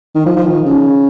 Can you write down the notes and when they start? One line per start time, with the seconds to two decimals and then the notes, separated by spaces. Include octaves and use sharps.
0.15 D#3
0.26 F3
0.36 F3
0.46 D#3
0.66 C#3